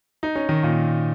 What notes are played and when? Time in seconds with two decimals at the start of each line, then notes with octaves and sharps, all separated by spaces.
0.23 D#4
0.35 C#4
0.49 D#3
0.63 A#2